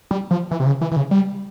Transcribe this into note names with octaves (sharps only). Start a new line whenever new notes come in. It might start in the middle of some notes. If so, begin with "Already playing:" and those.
G3
F3
E3
C3
C#3
E3
E3
C#3
G3